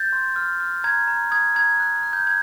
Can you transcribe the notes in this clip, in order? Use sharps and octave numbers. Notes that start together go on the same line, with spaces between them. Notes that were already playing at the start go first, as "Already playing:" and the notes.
Already playing: G6 A6
C6
F6
F6
A#5 G#6
A#5
D#6 G#6
A#5 G#6
F#6
F#6
G6
F#6 G#6